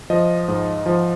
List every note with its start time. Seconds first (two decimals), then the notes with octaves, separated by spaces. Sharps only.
0.10 F3 D#5
0.48 G#2
0.86 F3